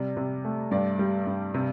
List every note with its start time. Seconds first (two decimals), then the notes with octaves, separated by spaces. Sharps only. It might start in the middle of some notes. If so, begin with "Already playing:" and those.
Already playing: C3 G3 D5
0.17 C3
0.44 A3
0.71 G2 D5
0.99 G3
1.27 G2
1.54 C3